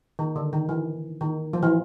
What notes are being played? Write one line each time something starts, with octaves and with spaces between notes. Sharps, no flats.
D#3
D3
D#3
E3
D#3
F3
E3